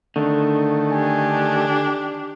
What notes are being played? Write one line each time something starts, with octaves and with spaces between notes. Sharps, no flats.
D3 D#3 A3
D4 G4 G#5